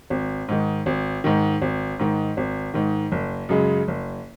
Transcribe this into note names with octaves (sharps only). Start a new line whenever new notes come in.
G#1
G#2 D#3
G#1
G#2 D#3
G#1
G#2 D#3
G#1
G#2 D#3
F#1
F#2 C#3 G#3
F#1